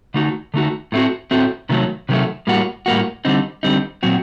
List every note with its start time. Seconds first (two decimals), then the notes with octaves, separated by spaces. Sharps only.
0.14 D3 A3 D#4 F#4
0.54 D3 A3 D#4 F#4
0.92 A2 A3 C4 F#4
1.31 A2 A3 C4 F#4
1.69 C3 D#3 F#3 A3
2.09 C3 D#3 F#3 A3
2.47 A2 G3 A#3 F#4
2.86 A2 G3 A#3 F#4
3.25 D3 G3 C4 D#4
3.63 D3 G3 C4 D#4
4.03 A#2 F#3 C4 F#4